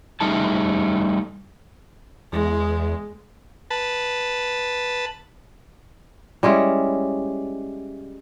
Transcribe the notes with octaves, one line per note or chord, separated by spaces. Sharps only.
G3 A3 D#4 G#4 A5
E2 G#3
B4 A5
G3 G#3 C#4 E4